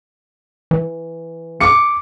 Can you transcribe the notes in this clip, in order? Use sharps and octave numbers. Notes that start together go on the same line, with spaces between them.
E3
D6 C#7